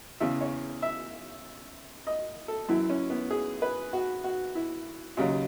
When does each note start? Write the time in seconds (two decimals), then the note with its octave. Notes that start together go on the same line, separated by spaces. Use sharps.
0.20 E2 C#3 E3 E5
0.41 C#5
0.82 E5
2.07 D#5
2.48 A4
2.69 F#2 E3 E4
2.90 C#4
3.10 B3
3.31 G#4
3.62 B4
3.93 F#4
4.24 F#4
4.55 E4
5.17 D#2 C#3 F#3